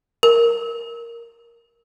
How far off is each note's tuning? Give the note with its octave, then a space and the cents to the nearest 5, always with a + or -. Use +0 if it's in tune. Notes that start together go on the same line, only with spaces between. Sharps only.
A#4 +0